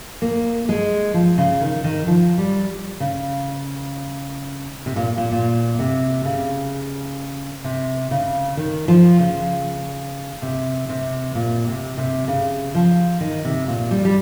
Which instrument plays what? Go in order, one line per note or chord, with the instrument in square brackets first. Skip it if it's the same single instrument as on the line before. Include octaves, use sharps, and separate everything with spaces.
[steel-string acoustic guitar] A#3
G#3
F3
C#3
D#3
D#3
F3
G3
C#3
C3
A#2
A#2
A#2
C3
C#3
C3
C#3
D#3
F3
C#3
C3
C3
A#2
C3
C3
C#3
F3
D#3
C3
A#2
G3
G3